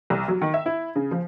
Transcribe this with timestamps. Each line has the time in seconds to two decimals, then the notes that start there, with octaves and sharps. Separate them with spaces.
0.10 C2
0.28 F#3
0.41 D#3
0.54 E5
0.66 E4
0.96 C#3
1.11 F3